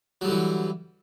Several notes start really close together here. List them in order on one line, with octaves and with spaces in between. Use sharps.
F#3 G3 D3 E3